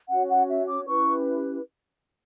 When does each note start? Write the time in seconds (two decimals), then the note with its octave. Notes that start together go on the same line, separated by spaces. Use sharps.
0.10 C#4 F#4 C#5 F#5
0.29 F#5
0.48 E5
0.67 D6
0.86 C#4 E4 G4 B4 C#6